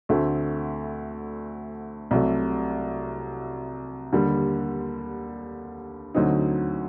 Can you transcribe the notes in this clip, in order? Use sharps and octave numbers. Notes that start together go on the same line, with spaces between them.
D2 D3 A3 C4
C2 C3 F#3 A3
D#2 D3 G3
D2 D3 F#3 C4 D#4